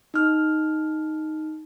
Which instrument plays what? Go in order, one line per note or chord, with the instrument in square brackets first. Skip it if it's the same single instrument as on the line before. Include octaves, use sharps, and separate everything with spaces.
[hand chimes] D#4 F6